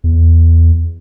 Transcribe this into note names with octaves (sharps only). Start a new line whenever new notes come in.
E2